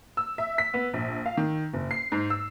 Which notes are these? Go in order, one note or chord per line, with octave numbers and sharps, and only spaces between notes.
E6
E5
B6
B3
A#1
F5
D#3
F#1
C7
G#2
E6